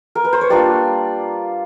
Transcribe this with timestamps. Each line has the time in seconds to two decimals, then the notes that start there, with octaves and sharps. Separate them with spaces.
0.15 A#4
0.25 B4
0.33 C5
0.41 C#5
0.50 G3 A#3 D4 F4 D5